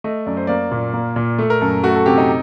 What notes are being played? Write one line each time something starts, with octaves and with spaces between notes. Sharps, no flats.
A3 D#5
F#2 D5
C5
A#3 D5
A#2
A#3
A#2
A3 A4
A#4
F#2 A4
A3 F#4
A4
C3 G4
D#4